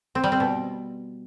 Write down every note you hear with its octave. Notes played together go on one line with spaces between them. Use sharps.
C4
G3
C4
B2